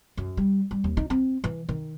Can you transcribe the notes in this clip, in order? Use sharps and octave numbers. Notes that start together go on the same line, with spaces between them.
F#2
G3
G3
D#2
D#4
C4
E3
D#3